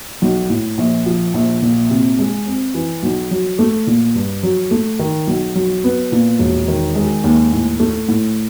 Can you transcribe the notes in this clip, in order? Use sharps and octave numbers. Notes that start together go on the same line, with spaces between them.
B1
A2
A#1
F3
A#1
A#2
C3
G#3
C4
E3
B1
F#3
A3
A#2
G2
F#3
A3
D#3
B1
F#3
B3
A#2
E1
D#3
G#3
D#2
A2
A3
A2